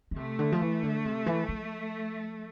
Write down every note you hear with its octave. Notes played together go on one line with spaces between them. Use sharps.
D3
C3 A3
D3
F3
E3
D3
C3
E3
F3